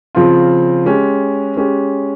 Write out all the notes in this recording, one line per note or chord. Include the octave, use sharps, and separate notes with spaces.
C#3 F3 C4 F4
G#3 C#4 G4
G#3 C#4 G4